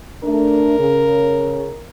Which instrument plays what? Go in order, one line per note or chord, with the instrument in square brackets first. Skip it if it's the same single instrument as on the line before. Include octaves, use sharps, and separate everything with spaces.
[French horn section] A3 D4 [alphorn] A#4
[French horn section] C#3